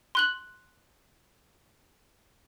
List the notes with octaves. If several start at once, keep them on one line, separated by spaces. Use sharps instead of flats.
C6 F#6 F#7